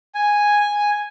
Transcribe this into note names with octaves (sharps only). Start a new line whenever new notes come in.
G#5